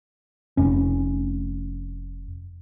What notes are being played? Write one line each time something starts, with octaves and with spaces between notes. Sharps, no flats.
F1 C#4